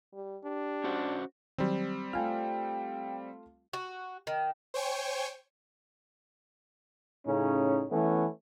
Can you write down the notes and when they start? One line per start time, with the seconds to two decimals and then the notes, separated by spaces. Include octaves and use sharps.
0.13 G3
0.44 D4 G4
0.84 C#4 F#4 C5
1.58 D#3 F#3 G3 C4
2.13 A3 F4 G5 G#5 F6
3.73 F#4
4.27 D#3
4.74 C5 C#5 G5 G#5 C#6
7.26 A2 C#3 C#4 D#4
7.90 E3 A3 B3 C#4